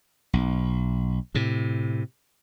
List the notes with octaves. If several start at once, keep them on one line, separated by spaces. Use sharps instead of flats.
B1
A2 C3